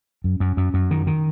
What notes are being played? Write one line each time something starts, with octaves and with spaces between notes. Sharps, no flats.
F#2
F#2
F#2
F#2
D#3
D#3